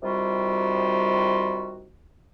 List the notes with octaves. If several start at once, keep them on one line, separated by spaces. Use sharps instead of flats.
C3 D#3 G3 F4 F#4